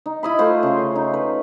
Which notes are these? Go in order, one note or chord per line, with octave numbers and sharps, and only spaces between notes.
D#4
E4 D#5 B5
A3 F4 C5
C#3 C6
D#4
B4